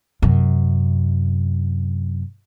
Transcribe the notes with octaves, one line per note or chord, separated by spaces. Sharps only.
F#2 C3